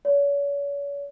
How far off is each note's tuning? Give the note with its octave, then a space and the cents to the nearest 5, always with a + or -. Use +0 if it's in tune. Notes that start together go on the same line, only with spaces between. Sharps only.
C#5 +40